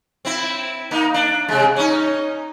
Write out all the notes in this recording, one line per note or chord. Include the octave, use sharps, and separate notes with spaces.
C4 E4
A#3 D#4
D4
C3 G#3
C#4 D#4